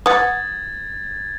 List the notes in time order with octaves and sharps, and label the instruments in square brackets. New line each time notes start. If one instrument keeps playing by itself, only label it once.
[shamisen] B4 F#5 [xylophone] D#6 [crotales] G#6 A6